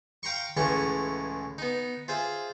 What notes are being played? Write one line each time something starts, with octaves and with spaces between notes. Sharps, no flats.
F5 G5 A#5 C6 C#6
C#2 A2 E3 G#3 C#4 C#6
B3 D#4
F4 G#4 C5 E5